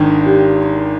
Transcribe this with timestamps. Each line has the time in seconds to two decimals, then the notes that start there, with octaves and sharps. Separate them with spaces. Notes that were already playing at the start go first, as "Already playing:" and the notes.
Already playing: G#1 G#2 D#3 D4
0.26 G4